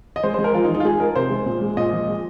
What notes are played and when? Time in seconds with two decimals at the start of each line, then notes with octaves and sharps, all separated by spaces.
0.16 D#5
0.23 G#3 C5
0.34 G#3 C5
0.44 A#4
0.54 F3 F4
0.64 D#4
0.69 F3
0.75 D#4
0.80 F4
0.85 G#3 G#4
1.00 G#3 A#4
1.16 C3 C5
1.31 G#3
1.46 A#2
1.61 G#3
1.77 A#2 D#5
1.93 F3
2.08 G#3